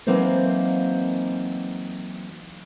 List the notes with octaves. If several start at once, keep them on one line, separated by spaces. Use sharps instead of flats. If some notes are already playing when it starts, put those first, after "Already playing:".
E3 F#3 A#3 C4 D#4 C5